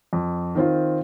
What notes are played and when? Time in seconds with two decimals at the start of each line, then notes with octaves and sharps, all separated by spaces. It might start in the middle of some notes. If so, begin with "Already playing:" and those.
0.13 F2
0.55 D#3 C4 F4